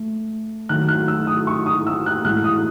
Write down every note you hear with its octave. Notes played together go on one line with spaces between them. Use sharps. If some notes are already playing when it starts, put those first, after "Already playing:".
Already playing: A3
D#3 F#3 A3 F#6
F#6
E6
D#6
C#6
D#6
E6
F#6
A2 E3 G#3 F#6
D#6